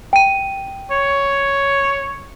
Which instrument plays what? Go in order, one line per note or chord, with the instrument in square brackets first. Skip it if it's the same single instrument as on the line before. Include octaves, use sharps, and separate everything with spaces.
[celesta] G5 D#7
[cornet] C#5